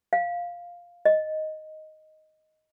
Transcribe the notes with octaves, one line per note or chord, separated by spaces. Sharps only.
F5
D#5